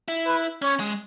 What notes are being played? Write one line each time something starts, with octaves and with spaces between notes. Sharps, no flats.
E4
B4
C#4 C#5
G#3